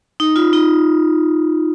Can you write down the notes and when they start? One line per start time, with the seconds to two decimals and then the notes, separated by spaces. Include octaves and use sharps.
0.20 D#4
0.36 F4
0.53 D#4